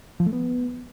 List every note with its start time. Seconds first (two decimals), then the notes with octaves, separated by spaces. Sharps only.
0.20 F3
0.26 A3
0.33 B3